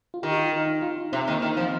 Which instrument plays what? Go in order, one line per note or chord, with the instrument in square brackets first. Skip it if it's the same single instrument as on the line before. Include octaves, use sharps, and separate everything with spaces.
[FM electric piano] F4
[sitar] D#3 [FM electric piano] G4
[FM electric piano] F4
D#4
D#4
F4
D#4
[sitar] C3 [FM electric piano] C4
[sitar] D#3 [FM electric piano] A#3
[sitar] D#3 [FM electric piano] D#4
[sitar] F3 [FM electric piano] C4